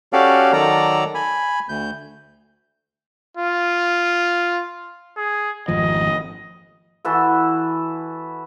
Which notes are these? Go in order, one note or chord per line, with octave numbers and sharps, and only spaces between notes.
C#4 F#4 G4 A4 D5 F5
D#3 F#3 A4 D5 A#5
G#5 B5
D2 G6
F4
G#4
G#1 F2 F3 D#5
E3 F#4 A4